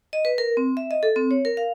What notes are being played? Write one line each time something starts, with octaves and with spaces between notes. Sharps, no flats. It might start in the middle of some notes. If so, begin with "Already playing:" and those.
D#5
B4
A#4
C4
E5
D#5
A4
C4
C#5
A#4
F5